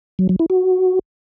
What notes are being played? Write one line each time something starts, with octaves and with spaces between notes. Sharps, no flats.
F#3
F#3
E4
F#4